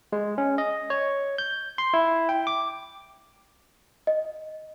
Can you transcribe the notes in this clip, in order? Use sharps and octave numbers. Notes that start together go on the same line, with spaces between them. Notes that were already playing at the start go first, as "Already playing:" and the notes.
G#3
C#4
D#5
C#5
G6
C6
E4
G5
D6
D#5